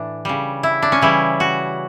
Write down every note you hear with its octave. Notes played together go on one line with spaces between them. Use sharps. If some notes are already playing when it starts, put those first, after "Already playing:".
Already playing: A2 E3 D4
C#3 G3
E4
D4
C#4
C#3 E3 G3 E4
F#4